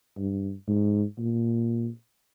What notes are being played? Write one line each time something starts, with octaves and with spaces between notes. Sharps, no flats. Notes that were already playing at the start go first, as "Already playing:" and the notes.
G2
G#2
A#2